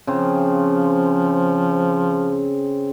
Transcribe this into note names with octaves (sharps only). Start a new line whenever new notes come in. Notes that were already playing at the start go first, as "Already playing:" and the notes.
C#3 F3 C4